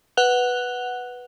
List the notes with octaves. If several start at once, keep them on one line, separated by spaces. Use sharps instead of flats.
B4 F#5 F#6 F7 G7